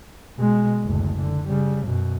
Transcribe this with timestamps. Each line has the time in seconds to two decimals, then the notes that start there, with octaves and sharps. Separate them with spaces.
0.37 B2 G#3
0.83 F#1 D2
1.19 D3
1.48 C#3 G3
1.86 F#2 B2